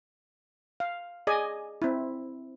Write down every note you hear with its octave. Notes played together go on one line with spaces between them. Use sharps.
F5
G#4 D5 D#5 G#5
C4 E4